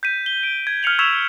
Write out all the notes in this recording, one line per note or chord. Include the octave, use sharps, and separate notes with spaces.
G6 B6 D#7
G7
D7
G#6
F6 B6 C#7 F7 F#7
C#6 E6 G#6 B6 E7 F7